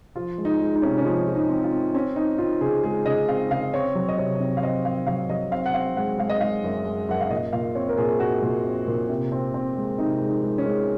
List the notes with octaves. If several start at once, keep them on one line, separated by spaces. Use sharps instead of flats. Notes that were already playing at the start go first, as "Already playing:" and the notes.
F3 F4
G#3
D#4
G#3
D#4
C3 C#4
C#4
F3 D#4
F3
D#4
C4
F4
C4
C4 C#4
C4 D#4
C4 F4
C#3 G#4
G#3 G#4
C#3 D#5
C4 F5
C#3 F5
C4 C#5
F#3
D#5
C3 C#5
C3
F5
C4 D#5
C4 F5
F#3 F5
F#3 D#5
C4 F5
F#5
C4 F5
G#3 F#5
G#3 F5
D#5
G#3 F5
F#2
G#3
F#2 F#5
F5
A#2 D#5
A#2 F5
C4 C#5
A#4
A#2 G#4
A#2 F#4
A#2
C4
A#2
C3
C4
C4
G#3
C3 D#4
G#3
D#4
G#3
C#4
G#3